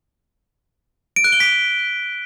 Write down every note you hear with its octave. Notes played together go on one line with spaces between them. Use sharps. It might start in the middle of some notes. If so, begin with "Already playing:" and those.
D7
F#6
G7
B6